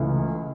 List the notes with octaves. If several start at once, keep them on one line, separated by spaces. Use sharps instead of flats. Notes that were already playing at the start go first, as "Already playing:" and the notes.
Already playing: C#2 C#3 E3 A3